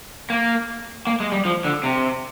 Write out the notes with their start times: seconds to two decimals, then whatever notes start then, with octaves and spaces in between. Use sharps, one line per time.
0.30 A#3
1.07 A#3
1.20 G#3
1.32 G3
1.45 F3
1.65 D3
1.84 C3